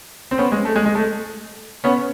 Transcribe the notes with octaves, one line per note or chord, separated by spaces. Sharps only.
C4
B3 C#4
G#3
A3
G#3
G#3
A3
B3 C#4